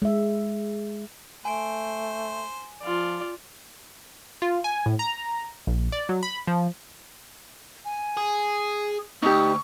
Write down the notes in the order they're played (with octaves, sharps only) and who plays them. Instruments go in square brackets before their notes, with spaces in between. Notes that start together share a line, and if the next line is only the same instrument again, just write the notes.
[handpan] G#3 E5
[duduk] A3 [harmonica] C5 [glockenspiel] G#5 D7
[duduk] F3 [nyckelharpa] F4 D5
[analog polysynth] F4
G#5
A2
A#5
A#1
D5
F#3
B5
F3
[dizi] G#5
[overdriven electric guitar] G#4
[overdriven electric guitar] D2 [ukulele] D#4 G4 [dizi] C#6